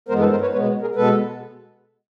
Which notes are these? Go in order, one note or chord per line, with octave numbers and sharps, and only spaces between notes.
G2 E3 G#3 B3 A#4 C5
A4 B4
A#4 C5
B4 C#5
B2 G#3 B3 B4 C#5
G#4 A#4
B2 G#3 B3 A4 B4